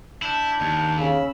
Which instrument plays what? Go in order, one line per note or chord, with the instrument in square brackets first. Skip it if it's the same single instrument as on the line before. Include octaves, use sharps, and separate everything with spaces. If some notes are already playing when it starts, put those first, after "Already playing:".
[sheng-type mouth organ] D4 G6 [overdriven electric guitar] E4
[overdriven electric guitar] D#2
[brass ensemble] C#3 [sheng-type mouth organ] B5 E6